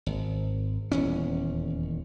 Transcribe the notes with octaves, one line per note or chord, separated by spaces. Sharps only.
G#1
D#1 E2 C#4